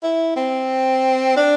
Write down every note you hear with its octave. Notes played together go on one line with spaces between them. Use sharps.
E4
C4
D4